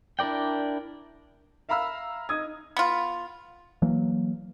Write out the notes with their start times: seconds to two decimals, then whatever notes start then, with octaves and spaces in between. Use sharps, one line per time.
0.19 D4 E4 A#4 D5 G5
1.69 E5 F5 A#5 B5 E6 F6
2.29 D#4 D#6 G#6
2.77 B3 F4
3.82 E3 F#3 A#3